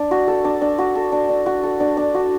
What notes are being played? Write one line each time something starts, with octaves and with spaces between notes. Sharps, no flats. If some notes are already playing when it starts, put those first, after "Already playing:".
Already playing: D4
F#4
A4
D4
D4
F#4
A4
D4
D4
F#4
A4
D4
D4
F#4